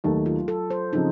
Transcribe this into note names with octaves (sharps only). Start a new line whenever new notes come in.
D#2 D#3 F#3 A3 D#4 A4
F4
A4
C5
C#3 F3 C4 D#4